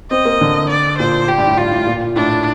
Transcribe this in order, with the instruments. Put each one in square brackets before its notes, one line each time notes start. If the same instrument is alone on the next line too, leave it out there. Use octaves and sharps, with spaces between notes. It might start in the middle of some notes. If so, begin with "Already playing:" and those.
[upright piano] C4 [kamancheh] D#5
[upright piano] A#3
D3
[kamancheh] D5
[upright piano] A#2 [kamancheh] C5
[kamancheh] G4
[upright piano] G2
A2
[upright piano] G2 [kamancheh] F4
[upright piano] A2
A#2
[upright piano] A2 [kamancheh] D4